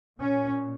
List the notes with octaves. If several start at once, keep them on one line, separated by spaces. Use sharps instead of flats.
A#2 C#4